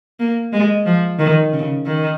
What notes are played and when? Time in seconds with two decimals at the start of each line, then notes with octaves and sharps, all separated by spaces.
0.20 A#3
0.53 G#3
0.86 F3
1.19 D#3
1.52 C#3
1.86 D#3